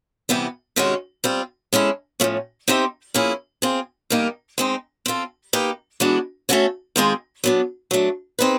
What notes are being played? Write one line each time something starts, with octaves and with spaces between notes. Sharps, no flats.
C3 E3 G3 B3
C3 D#3 G#3 C#4 F#4
G3 C4 F4
G#3 C#4 E4 A4 C#5
A2 F3 A3 C#4
C4 D#4 G4 C5 E5
F3 A#3 C#4 E4 G#4
C4 F4 G#4
D#3 G3 A#3 D#4
G#3 C4 D#4
C4 F4 A4
A#3 D#4 G4 B4
E3 G#3 B3 D4 F#4
A3 C#4 F#4 A4 C#5
D#3 G#3 C4 F4 G#4
F#3 B3 D4
F#3 A3 D4
C4 D#4 G#4 B4